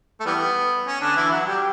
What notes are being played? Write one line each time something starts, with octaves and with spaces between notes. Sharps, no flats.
A3
E3 G3 B3
C#4
D3 D4
E3 E4
F#3 F#4
G3 G4